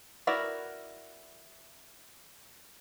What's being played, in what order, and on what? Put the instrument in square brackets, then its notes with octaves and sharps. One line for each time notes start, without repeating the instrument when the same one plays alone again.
[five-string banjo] E4 F#4 A#4 B4 D5